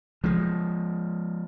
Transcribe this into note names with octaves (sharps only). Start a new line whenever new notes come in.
F3 G#3